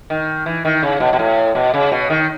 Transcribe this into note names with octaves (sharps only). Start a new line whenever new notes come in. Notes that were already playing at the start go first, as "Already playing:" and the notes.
D#3
E3
D#3
C#3
B2
B2
A2
B2
C#3
B2
D#3